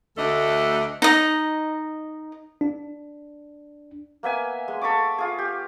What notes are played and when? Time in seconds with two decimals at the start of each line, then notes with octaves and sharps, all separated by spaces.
0.17 D2 A3 D4 A4 D#5
1.02 D#4 D#5
2.61 D4
4.23 A#3 B3 E5 G#5
4.68 G#3
4.81 A4 B5 C#6 D6
5.18 F4 G#4
5.39 G4